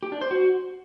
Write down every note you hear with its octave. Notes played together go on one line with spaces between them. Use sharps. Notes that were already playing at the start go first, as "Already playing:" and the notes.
G4
D4
C5
F#4